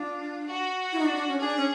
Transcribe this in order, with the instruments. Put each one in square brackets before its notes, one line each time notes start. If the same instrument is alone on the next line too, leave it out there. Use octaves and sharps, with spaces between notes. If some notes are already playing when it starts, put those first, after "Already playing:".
Already playing: [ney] D4 [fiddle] F4
[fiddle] F#4
[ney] E4
D#4
D4
D4
C#4
[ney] D4 [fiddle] G#4
[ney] C#4